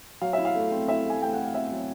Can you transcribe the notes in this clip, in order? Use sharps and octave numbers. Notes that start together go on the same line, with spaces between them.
F#3 F5
E4 E5
F5
A3
C4
E4 E5
A3 G#5
A3 G5
F#5
A3
F5
C4 E5
F#3